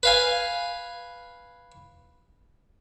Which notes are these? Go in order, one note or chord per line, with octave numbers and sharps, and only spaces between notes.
B4 F5 G#5